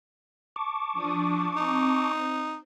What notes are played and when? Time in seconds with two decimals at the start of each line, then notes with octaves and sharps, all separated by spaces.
0.56 A5 C#6 D6
0.93 F3 D4 D#6
1.56 C4 D#4